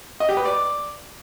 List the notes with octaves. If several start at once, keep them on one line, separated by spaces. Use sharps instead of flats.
D#5
G4
B4
D5